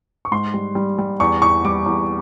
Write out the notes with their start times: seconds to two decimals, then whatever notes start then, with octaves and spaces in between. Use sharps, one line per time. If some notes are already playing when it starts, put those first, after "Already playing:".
0.25 C#6
0.31 G#2 C6
0.54 G3
0.75 G3
0.99 G3
1.20 E2 C#6
1.41 E2 C#6
1.65 G3 D6
1.86 E2